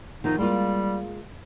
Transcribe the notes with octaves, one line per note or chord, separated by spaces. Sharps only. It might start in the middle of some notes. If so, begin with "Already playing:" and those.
E2 D#3 F3 D#4
G3 G#3 A#3 F4